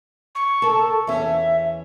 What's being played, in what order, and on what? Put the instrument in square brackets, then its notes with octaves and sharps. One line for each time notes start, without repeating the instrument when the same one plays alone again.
[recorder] C#6
[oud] A4 A#4
[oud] E2 C#4 [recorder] E5